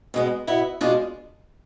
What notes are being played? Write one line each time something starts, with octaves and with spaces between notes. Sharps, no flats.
B2 G#3 B3
B2 B3 E4
B2 G#3 D4 F4